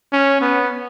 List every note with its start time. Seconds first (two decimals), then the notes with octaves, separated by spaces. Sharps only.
0.12 C#4
0.41 B3